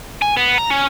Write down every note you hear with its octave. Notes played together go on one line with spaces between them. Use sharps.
G#5
B3
A#5
C#4